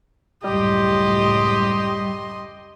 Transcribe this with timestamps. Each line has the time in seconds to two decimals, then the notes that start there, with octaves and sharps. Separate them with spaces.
0.44 C#2 F#2 A2 G3 G4 D#5 C6